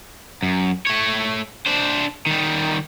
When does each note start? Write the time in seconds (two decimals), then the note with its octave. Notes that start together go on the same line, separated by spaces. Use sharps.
0.42 F#2
0.87 A3 C#5
1.66 D4 C5
2.27 D#3 G3